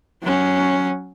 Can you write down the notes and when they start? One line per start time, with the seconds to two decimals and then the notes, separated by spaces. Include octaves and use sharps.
0.23 F#3 C#4